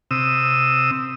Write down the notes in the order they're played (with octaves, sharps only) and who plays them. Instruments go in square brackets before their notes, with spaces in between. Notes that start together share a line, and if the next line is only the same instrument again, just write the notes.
[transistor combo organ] C3 D#6 E6